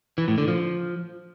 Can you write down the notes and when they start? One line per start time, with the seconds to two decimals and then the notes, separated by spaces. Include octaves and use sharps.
0.18 E3
0.28 A2
0.38 D3
0.48 F3